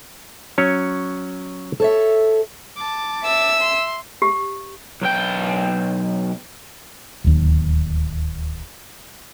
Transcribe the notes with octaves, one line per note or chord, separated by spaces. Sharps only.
F#3 C#4 C#5
A4 C#5 E5
A5 D6
E5 E6
C6
G4
B1 G5
D1 D#2